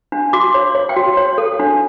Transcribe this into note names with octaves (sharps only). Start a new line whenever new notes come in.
D4
F#4 D6
C#5
C#5
G5
F#4
C#5
A4
D4